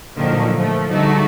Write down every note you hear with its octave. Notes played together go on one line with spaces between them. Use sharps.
G2 A#2 D3 D#3 F3 F#3
F3 A3
G2 D3 G#3 A3 D#4 F#4